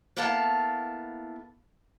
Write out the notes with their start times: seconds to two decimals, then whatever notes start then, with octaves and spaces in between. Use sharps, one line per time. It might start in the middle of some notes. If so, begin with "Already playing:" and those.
0.17 A#3 B3 E4 A4 F5 A5